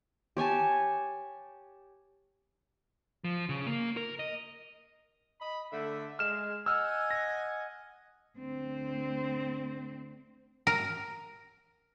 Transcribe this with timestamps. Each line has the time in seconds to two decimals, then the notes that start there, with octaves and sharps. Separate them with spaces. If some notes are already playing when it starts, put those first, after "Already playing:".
0.37 G4 C#5 G#5 A5
3.24 F3
3.49 C#3
3.67 A#3
3.97 A#4
4.19 D#5
5.41 D#5 B5
5.72 D3 A3 E5
6.19 G#3 F6 E7
6.66 D#5 F#5 G#5 E6 F6
7.11 A#6
8.39 D2 C4
10.67 A#4